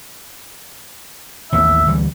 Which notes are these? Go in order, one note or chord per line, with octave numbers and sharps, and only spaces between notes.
A1 D#2 B3 E5
D2 E3 G3